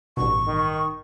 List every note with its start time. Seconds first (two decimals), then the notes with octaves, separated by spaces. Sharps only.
0.17 A1 G2 B2 C#6
0.47 D#3